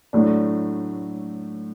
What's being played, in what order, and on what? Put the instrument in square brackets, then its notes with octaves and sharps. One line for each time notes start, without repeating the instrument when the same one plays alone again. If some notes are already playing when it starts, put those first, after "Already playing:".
[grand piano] A2 F#3 A3 D4